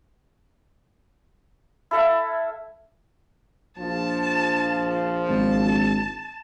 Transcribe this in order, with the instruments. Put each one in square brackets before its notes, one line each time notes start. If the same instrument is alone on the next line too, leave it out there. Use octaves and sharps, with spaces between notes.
[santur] E4 A4 E5 F5
[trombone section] A#1 [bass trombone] F3 [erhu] A5
[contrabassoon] G#1 [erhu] A5